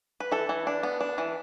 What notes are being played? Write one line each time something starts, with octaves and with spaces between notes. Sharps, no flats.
B4
E3 A4
E3
D4
B3
D4
E3